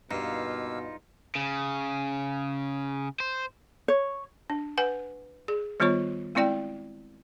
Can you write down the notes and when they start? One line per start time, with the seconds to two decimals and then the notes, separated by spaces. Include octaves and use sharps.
0.11 G2 B2 A#3 D#4 F4 F5 E6
1.35 C#3
3.20 C5
3.88 C#5
4.50 D4
4.78 B4 F#5 G#5
5.48 G#4
5.80 D#3 G3 B3 F4 C#5 C#6
6.35 G#3 C4 E4 D5 G5